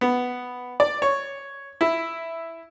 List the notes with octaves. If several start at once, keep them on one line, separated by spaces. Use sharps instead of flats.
B3
D5
C#5
E4